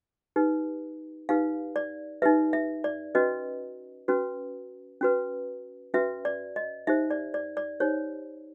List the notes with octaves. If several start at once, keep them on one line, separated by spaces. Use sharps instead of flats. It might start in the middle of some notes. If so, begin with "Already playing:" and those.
D#4 G4 B4
D#4 G4 B4 F5
D5
D#4 G4 B4 E5
E5
D5
C#4 F#4 B4 D#5
C#4 F#4 B4
C#4 F#4 B4
C#4 F#4 B4 E5
D5
D#5
D#4 G4 C5 E5
D5
D5
D5
D#4 G4 C5 C#5